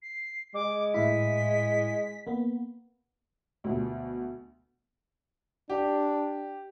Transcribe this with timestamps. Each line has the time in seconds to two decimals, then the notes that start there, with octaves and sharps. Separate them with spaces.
0.02 C7
0.54 G#3 D6
0.94 A2 E4 B6
2.27 A#3 B3
3.64 D2 B2
5.70 D4 G4